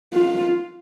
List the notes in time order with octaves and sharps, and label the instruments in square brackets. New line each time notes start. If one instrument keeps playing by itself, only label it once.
[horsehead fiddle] F4